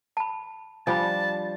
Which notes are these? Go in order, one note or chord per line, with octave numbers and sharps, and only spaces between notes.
A5 B5
F3 G3 D4 G#5 A5 B5